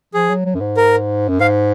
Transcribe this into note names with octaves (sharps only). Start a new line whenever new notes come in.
F3 G#4
F#3
F#3
F#2
G#2
A#4
F#2
G#2 F5